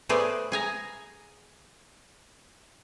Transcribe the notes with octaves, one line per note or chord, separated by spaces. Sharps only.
A3 B3 G#4 B4 C5 D5
G#4 G#5 A#5